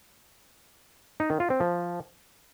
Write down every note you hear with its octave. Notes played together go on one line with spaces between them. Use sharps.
D#4
D#3
F4
C4
F3